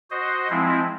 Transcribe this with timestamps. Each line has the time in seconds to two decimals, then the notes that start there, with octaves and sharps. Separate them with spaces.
0.11 F#4 C5 D#5
0.50 F3 G#3 C4 E4